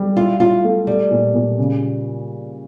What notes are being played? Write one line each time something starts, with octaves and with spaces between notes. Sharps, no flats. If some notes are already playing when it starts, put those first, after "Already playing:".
Already playing: G3
E4 F4
E4 F4
A3
G3 A3
A#2
A#2
C#3